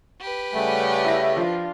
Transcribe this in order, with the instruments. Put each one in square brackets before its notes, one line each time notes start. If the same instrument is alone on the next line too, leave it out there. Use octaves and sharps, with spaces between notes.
[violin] G4 B4
[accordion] C#3 G3 A3 [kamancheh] F#5 G#5
[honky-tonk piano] E4 A#6
[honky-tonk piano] F3 [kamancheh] D4 F4